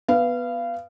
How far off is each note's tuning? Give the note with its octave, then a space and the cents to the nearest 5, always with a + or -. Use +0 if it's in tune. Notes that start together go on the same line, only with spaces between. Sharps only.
B3 +0 F5 -25